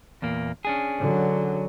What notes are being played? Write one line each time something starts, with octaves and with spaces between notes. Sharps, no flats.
E2 A#2 A#3
C#4 D4 G#4
D3 F#3